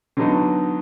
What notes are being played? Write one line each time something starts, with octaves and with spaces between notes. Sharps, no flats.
D3 F#3 B3 D#4